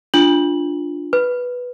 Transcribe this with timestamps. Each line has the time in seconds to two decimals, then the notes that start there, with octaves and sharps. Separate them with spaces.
0.14 D4 F4 F#7
1.13 B4